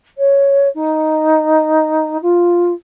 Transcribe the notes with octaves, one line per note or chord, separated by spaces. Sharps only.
C#5
D#4
F4